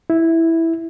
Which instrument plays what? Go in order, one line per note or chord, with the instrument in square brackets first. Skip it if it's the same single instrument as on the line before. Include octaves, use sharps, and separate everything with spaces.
[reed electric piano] E4